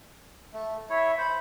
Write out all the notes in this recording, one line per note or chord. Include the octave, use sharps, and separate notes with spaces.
A3
E4 C#5 E5
C5 B5